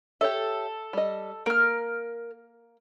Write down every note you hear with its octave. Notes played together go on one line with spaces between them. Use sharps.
G4 A4 C#5 E5
G3 D#5
A#3 A#4 F6